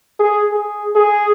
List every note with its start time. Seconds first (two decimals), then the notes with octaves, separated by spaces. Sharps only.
0.20 G#4
0.52 G#4
0.95 G#4